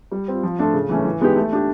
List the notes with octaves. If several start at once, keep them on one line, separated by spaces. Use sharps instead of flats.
G3
C4 F4
F3
A3 D4 F4 A4
C#3
E3 A3 C#4
E3
G#3 B3 D#4 G4
A3
D4 G4